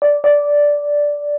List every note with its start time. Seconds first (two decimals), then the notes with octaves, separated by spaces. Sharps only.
0.02 D5
0.24 D5